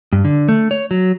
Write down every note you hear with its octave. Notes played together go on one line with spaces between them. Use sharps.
G2
D3
A3
C#5
F#3